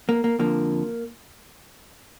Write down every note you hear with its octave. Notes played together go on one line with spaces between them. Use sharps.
A#3
A#3
F2 D3 F3 A#3